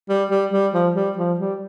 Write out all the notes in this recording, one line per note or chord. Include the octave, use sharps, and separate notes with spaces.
G3
G3
G3
F3
G3
F3
G3